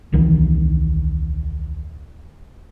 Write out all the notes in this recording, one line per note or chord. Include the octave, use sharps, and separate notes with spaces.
D#1 C2 D#3 E3